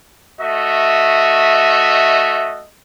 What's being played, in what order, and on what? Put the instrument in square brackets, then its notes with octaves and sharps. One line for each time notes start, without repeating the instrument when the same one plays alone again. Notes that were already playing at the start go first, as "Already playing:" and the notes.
[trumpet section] A3 F#4 D#5 E5